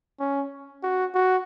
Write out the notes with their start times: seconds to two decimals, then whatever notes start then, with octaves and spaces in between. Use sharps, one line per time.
0.20 C#4
0.83 F#4
1.15 F#4